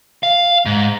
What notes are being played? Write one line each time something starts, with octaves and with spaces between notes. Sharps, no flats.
F5
G#2